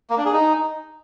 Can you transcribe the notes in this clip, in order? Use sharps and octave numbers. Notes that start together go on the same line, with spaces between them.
A#3
D4
G#4
D#4